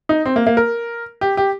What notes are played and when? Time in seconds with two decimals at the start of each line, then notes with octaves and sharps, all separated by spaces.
0.09 D#4
0.26 C4
0.36 A#3
0.47 A#3
0.57 A#4
1.21 G4
1.37 G4